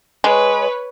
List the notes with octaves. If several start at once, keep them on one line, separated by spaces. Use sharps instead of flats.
G#3 B4 C#5